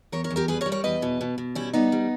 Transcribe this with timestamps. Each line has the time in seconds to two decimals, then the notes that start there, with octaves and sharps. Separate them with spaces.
0.12 E2 A#4 C#5
0.24 A#4 C#5
0.30 E2
0.36 G4 A#4
0.48 G3 G#4 B4
0.61 A#4 C#5
0.66 G3
0.72 A#4 C#5
0.84 E2 B4 D#5
1.02 B2
1.21 B2
1.38 B2
1.55 G3 C#4 E4
1.73 G3 B3 D#4
1.92 G3